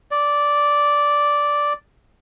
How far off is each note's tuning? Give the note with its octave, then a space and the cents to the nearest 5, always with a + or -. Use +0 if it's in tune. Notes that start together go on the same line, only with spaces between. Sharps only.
D5 -5